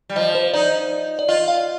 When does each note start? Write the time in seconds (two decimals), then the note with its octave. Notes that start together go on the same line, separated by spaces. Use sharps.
0.09 G3
0.16 F3 D#5
0.35 C5
0.54 D#4 D5
1.19 D5
1.28 F4 D#5
1.48 F5